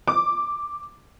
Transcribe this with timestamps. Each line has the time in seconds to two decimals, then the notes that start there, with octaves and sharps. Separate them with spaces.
0.08 D6